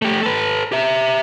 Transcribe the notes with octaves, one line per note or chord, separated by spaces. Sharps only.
A3 G4
A4 B4
G4 E5